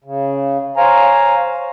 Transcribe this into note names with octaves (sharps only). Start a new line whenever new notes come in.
C#3
C5 C#5 F5 G#5 A#5